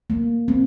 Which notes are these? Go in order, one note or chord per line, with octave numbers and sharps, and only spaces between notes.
A#3
C4